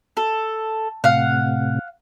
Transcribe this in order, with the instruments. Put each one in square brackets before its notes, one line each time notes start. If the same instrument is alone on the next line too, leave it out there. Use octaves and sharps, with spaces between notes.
[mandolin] A4
[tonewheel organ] A2 C3 [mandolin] F5 F#5